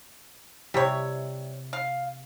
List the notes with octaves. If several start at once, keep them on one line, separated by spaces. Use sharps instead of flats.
C3 G3 E4 G4 C#5
F5